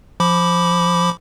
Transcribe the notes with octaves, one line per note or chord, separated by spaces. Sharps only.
F3 B5 D6